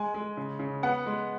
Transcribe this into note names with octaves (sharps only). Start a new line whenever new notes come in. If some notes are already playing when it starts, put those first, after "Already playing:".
Already playing: G#3 G#5
G#3
C#3
C#3
B3 F#5
G#3